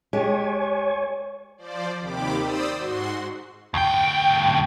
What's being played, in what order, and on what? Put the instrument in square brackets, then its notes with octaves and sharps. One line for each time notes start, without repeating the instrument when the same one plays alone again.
[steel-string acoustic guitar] G#3 G4 [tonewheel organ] C#5 G#5 C#6
[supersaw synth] F3 C5 D5
D#2 C3 D#3 G4 B5 D6
C5 D5 D#6 E6
G#2 F#4 C6
[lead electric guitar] D2 G5